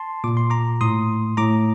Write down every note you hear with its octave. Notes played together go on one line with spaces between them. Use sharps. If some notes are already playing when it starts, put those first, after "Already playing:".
Already playing: A5 C6
A#2 D6
C6
A#5 D6
A2 C6 D#6
A2 A#5 D6